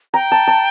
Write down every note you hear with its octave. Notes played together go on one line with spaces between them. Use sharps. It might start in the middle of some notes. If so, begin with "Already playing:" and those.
G5 A#5
A5
A5